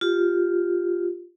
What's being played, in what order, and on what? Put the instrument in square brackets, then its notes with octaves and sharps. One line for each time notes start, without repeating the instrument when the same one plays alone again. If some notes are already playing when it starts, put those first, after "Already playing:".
[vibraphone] F4 G4